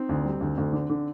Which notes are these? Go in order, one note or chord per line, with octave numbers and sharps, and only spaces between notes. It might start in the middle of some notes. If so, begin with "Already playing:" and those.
Already playing: C4 D#4
D2
G3
D2
D2
D3
D3